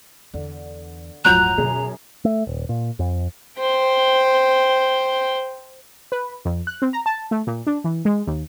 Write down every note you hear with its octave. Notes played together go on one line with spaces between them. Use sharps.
E2 D3
D1 G2 F3 F#3 A#5 F#6 G6
F#2 B2 G#4
A3
D#1
A#2
F2
C5 G5
B4
F2
F#6
C4
A#5
A5
A3
A#2
D4
E3
G#3
D#2